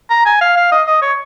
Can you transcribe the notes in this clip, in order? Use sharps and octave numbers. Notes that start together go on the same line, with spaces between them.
A#5
G#5
F5
F5
D#5
D#5
C#5